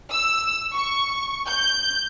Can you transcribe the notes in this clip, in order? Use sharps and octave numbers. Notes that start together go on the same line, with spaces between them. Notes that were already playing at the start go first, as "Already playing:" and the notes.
E6
C#6
G6